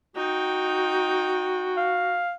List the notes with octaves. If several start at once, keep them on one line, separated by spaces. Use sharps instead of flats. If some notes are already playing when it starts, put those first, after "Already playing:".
D#4 F#4 G5
F5